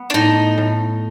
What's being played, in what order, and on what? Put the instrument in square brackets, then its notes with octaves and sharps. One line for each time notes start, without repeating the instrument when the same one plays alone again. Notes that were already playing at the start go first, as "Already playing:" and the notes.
Already playing: [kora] B3
[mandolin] D4
[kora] A2 [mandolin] D#4
[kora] A2